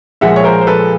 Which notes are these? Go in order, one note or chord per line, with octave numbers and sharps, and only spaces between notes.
A#2 F3 G#3 E5 F#5
C#5
A#4 C5
C5
A4 B4